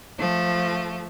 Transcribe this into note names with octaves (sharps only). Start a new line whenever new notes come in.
F3 A3